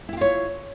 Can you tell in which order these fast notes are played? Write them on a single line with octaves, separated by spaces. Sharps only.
E4 G4 F4 C#5